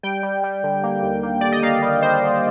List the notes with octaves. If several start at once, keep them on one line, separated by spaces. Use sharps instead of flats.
G3 G5
G3
G3
D3
A#3
D#2
A#3
D3 D5
D#5
A#3 F5
G3
G3 C5
D3